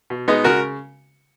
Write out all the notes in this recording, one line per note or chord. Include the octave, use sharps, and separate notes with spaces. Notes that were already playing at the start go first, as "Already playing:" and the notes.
B2
G#3 B3 D#4
C#3 F#4 A#4